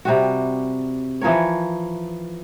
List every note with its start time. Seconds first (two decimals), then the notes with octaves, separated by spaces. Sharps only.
0.05 C3 G3 F#4
1.21 E3 F3 A#4 C#5